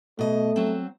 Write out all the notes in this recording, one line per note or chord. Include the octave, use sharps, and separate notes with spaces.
B2 A3 D#5
F#3 C4